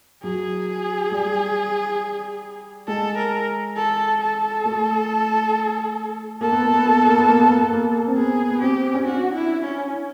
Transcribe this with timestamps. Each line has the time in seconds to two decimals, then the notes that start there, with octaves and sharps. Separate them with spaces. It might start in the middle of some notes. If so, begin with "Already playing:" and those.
0.23 F#3 G#4
1.11 G3
2.88 G#3 A4
3.18 A#4
3.77 A4
4.21 A4
4.65 A3
6.41 A#3 A4
6.52 B3
6.63 A#3
6.74 B3
6.85 A#3
6.96 B3
7.07 A#3
7.18 B3
7.29 A#3
7.40 B3
7.51 A#3
7.62 B3
7.73 A#3
8.07 C4
8.17 B3 G#4
8.51 B3
8.62 C4 G4
8.94 C#4
9.06 D4 F#4
9.35 E4
9.65 C#4